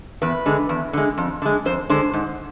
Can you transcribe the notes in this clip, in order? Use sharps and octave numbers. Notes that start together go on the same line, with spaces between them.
E2 B4
D3 G#3
E2
D3 G#3
F2
D3 G#3
F2 C5
D3 G#3 C5
G#2